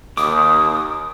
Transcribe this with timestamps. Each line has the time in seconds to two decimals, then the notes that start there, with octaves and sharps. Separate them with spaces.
0.17 D#2 D6 D#6